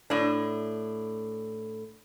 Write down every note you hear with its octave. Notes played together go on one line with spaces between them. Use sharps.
A2 D4